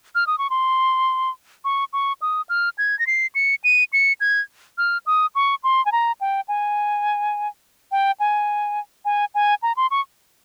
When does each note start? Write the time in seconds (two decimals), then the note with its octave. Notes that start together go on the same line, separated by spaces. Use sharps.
0.15 F6
0.27 D#6
0.38 C#6
0.50 C6
1.65 C#6
1.93 C#6
2.22 D#6
2.49 F6
2.78 G#6
2.99 A#6
3.07 C7
3.35 C#7
3.64 D#7
3.93 C#7
4.20 G#6
4.78 F6
5.06 D#6
5.35 C#6
5.64 C6
5.85 G#5
5.92 A#5
6.21 G5
6.48 G#5
7.91 G5
8.20 G#5
9.05 G#5
9.34 G#5
9.62 A#5
9.77 C6
9.91 C#6